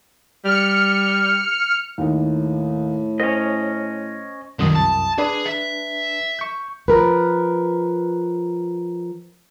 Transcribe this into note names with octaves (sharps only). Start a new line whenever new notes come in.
G3 F6 C#7
D#2 A2 D#4
C#4 C5 D#5
C2 F#2 D3 D#3 D#6
A5
D4 G#4 B4
E5
C#6 G6
F3 A#4 B4